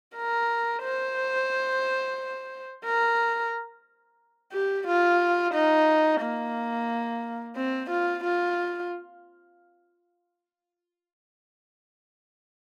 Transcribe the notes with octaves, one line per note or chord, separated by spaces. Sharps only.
A#4
C5
A#4
G4
F4
D#4
A#3
C4
F4
F4